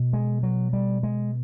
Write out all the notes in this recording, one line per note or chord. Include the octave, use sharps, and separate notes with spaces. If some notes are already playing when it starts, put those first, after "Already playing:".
Already playing: B2
G#3
F#3
G3
G#3